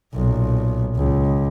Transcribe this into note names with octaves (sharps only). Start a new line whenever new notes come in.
B1 A#2
C#2